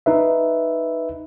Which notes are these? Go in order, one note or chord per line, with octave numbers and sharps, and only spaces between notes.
D#4 B4 E5